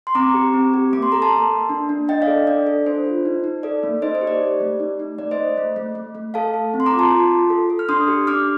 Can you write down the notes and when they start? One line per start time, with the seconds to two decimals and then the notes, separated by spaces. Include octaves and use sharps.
0.07 C6
0.15 C4 A#5 D6
0.34 G4
0.53 C4
0.74 G4
0.93 A#3 D6
1.02 C6
1.12 A4 A#5
1.22 A5 C6
1.31 A#3
1.51 A#3
1.69 D4
1.89 D4
2.08 D4 D#5 G5
2.22 D5 F5
2.27 A4
2.47 D4 D5
2.67 A4
2.86 D4 C5
3.06 F4
3.25 D#4
3.44 D#4
3.63 A4 D5
3.83 A#3
4.02 D#4 C5 D#5
4.15 C5
4.21 G4
4.27 D5
4.41 G4
4.60 A3
4.80 D#4
5.00 D#4
5.18 A3 D5
5.31 C5 D#5
5.38 A3
5.57 A3
5.76 A3
5.95 A3
6.15 A3
6.34 A4 F5 A5
6.54 A4
6.74 C4
6.80 C6
6.86 A#5 D6
6.92 F4
6.99 A5 C6
7.12 F4
7.31 F4
7.50 A4
7.70 A4
7.79 F6
7.89 D4 C6 D#6
8.08 G4
8.27 D4 D6 F6